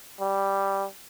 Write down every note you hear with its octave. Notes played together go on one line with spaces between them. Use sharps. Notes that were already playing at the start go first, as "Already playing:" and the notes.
G3